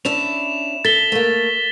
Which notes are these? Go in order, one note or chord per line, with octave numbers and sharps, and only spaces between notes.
C#4 D4 E4 E7 F7
A4 A6 B6 G7
A3 A#3